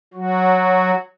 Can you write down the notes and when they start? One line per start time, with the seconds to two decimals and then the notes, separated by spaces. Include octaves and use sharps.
0.14 F#3 F#4